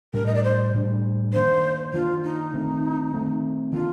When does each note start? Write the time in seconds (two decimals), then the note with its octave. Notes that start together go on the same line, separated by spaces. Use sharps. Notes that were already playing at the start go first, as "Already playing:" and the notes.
0.14 A2 G3 D4 A#4
0.26 D#5
0.35 D5
0.44 C5
0.74 A2 G3 D4
1.33 D#3 A#3 D4 C5
1.93 D#3 A#3 D4 F4
2.23 D#4
2.54 D#3 A3 C4
3.14 D#3 A3 C4
3.73 D#3 A#3 D4 F4